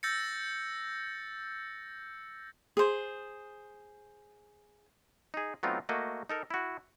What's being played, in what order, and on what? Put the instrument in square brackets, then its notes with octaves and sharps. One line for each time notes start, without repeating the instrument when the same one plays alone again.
[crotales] E6 G6 A6 A#6 C#7
[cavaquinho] G#4 C5
[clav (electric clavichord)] D#4 G#4
F#3 A3 B3 C4 D#4 F4
A3 A#3 F#4 D#5
D#4 A4 A#4
E4 F#4